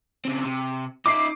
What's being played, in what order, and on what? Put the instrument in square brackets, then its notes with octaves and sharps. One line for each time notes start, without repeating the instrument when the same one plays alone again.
[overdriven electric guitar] C#3 C4
C3
[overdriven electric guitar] D#4 E5 [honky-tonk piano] D6 C7